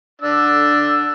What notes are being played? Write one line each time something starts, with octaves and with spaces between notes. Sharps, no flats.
D4 E6